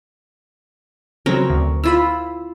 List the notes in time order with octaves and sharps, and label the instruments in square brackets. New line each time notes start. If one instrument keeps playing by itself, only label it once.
[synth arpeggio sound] C#3 F#3 [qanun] C4 A#4 C#5
[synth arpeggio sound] D2
[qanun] E4 F4 [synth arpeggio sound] B5 E6